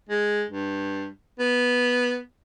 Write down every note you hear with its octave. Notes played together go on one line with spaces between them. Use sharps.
G#3
G2
B3